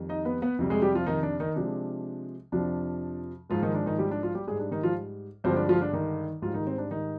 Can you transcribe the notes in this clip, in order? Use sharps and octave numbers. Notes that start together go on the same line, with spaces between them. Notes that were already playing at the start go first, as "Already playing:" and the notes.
Already playing: F2 D#3 G3
D#4 D#5
B3 B4
B3 B4
F2 C3 G3
G#3 G#4
G3 G4
F3 F4
D#3 D#4
D4
D#3 D#4
C3 F3 G#3 D4
F2 C3 F3 D4
G#2 F3 G#3 F4
D#3 D#4
D4
D#3 D#4
G3 G4
D4
F3 F4
G3 G4
G#2 G3 G#3 G#4
D4
D#3 D#4
F3 F4
G2 D3 F3 G#3 C4
D4
F3 F4
D4
D#3 D#4
G#2 F3 G3 F4
D#3 D#4
C4
D4
D#3 D#4